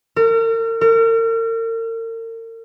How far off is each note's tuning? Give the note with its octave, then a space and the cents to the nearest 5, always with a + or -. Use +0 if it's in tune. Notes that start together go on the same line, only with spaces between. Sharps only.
A#4 -40
A#4 -40